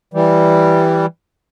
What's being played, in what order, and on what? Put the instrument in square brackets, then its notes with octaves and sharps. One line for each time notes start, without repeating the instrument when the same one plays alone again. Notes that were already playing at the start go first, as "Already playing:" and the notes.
[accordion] E3 G3